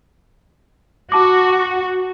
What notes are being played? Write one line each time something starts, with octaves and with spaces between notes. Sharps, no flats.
F#4 A5 D6